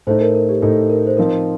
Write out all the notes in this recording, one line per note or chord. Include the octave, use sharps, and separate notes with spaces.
A2 A3 D#4 C5
A#4
A#4
G4
A2 A3 D#4 A4
A#4
C5
F3 C4 D#4 A#4